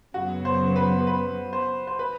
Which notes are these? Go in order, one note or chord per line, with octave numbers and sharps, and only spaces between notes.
F#2 C#3 F#3 B3 F#4
C5
B4
B4
C5
C5
B4